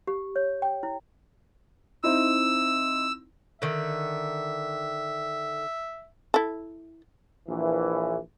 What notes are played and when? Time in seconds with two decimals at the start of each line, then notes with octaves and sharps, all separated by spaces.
0.07 G4
0.36 C#5
0.62 G5
0.83 E4
2.04 C4 D#4 E4 E6
3.62 D3 D#3 E5
6.34 E4 A4
7.48 A#1 E3